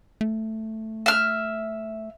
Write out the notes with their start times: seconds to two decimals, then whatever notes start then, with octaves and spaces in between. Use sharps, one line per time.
0.21 A3
1.06 E5 F6